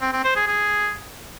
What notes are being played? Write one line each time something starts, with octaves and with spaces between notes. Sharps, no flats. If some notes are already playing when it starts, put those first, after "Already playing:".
C4
C4
C5
G#4
G#4